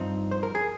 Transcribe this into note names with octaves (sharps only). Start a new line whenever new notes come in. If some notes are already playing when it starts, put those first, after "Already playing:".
Already playing: G2 F3 C4 D#4
C5
A#4
G#4